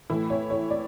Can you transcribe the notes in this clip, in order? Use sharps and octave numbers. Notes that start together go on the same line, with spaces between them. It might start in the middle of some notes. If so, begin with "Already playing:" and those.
A2 E3 E4
C#5
C#5
D5